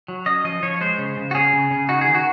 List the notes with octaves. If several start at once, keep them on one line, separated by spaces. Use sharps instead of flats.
F#3
C#4 D#5
F3 D#5
F3 C#5
G#3 C5
C#3
C#3
F#4
C#4 G#4
C#3
C#3
D#4 F#4
G#4
D#3
F#4